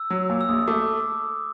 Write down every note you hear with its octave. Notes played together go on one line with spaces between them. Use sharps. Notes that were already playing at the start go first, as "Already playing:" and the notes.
Already playing: E6
F#3
A#2
E6
A#1 D#6
A3 D6